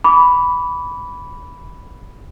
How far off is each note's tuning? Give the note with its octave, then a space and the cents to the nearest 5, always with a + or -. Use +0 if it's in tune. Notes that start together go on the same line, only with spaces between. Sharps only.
B5 +0 D6 -35